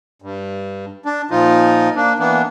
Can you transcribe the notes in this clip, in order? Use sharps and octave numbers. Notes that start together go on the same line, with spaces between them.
G2
D4
A#2 F3 D#4 F4
A#3 D4
E3 A#3 B3 D4